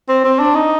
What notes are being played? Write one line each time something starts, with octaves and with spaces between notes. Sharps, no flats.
C4
C4
D4
D#4